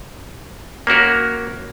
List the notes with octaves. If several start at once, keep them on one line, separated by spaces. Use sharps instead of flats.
A#3 C#4 F#4 A#4